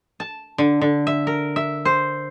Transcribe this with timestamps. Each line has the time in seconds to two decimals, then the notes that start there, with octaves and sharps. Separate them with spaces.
0.20 A5
0.58 D3
0.81 D3
1.07 E5
1.27 A#4
1.56 E5
1.85 C5